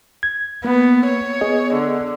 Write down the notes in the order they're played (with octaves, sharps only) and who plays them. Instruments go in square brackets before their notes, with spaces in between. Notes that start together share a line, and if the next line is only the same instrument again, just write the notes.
[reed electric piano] G#6
[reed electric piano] A#3 [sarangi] B3
[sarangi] C#5
[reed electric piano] B3 G#4 D#5
[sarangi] D3